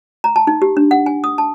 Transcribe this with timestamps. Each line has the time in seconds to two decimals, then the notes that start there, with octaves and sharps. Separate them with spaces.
0.24 A#5
0.36 A5
0.47 D#4
0.62 G4
0.77 D4
0.91 F#5
1.06 G#5
1.24 D#6
1.38 A5